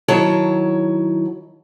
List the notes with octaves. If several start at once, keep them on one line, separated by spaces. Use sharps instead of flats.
D#3 F#3 E4 C#5 A5